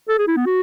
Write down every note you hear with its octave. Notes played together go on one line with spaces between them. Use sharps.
A4
G#4
E4
B3
F#4